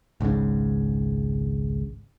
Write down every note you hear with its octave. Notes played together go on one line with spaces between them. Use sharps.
G#1 C#2 G#2 C#3